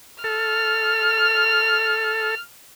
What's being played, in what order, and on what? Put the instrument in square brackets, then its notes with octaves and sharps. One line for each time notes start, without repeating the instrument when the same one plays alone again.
[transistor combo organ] A4 [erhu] F6